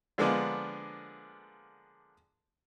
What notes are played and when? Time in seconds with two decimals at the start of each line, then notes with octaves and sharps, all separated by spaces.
0.18 D3 F3 G#3 A#3 B3 D4